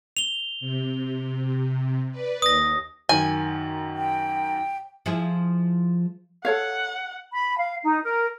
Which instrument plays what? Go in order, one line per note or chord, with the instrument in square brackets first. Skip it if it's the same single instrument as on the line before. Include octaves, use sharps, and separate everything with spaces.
[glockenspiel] F7 G7
[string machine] C3
B4 D5
[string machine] D#2 [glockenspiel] D#6 A#6
[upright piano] F#2 D#3 [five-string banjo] G#5
[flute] G5
[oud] F3 E4 G#4
[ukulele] A4 C#5 F5 [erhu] F#5
[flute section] B5
F5
D#4
A#4